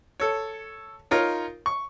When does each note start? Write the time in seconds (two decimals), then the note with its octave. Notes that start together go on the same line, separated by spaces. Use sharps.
0.20 A4 C#5
1.11 D#4 F4 A#4 C#5
1.66 C#6